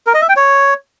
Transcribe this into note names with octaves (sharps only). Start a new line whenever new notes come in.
A#4
D#5
E5
G5
C#5